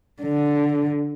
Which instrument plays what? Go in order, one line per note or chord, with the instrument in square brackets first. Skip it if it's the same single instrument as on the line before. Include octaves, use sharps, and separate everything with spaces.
[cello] D3